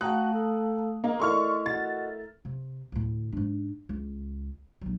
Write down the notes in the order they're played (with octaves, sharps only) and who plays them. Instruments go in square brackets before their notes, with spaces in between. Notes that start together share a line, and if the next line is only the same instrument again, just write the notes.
[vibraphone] A3 F5 A5 [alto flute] F#4 [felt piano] G5 A#5 D#6 [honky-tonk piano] F#6
[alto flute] A4
[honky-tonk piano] A#3 [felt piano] A#4 D#5
[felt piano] A3 E4 A#4 [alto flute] D5 [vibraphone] D#5 [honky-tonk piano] C6 C#6 F6
[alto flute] F#4 [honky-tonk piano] A6
[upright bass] C3
D2 A2
G#2 D4
C#2
A#1 F#3